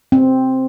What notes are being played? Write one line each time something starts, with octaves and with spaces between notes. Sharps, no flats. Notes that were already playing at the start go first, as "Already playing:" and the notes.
C4